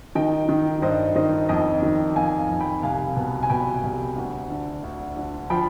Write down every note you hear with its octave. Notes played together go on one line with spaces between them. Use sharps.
D#3 D#5 G5
D#3
G2 C5 D#5
D#3 C5 D#5
F2 D#5 G5
D#3
F2 F5 G#5
F2
G5 B5
C2 F5 G#5
B2
G#5
B2 G5 B5
C2
D2
D3
D2
D3
F3 G5 B5